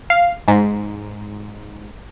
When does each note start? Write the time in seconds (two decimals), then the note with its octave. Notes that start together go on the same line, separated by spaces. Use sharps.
0.10 F5
0.48 G#2